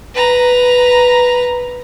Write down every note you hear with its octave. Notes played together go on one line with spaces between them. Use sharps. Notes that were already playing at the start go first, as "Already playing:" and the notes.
B4 A#5